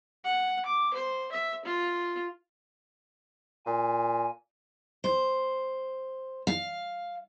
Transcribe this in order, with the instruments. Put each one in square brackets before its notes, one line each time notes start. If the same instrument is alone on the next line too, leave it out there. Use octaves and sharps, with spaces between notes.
[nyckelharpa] F#5
D6
C5
E5
F4
[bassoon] A#2 [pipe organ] G#5
[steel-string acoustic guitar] C5
F5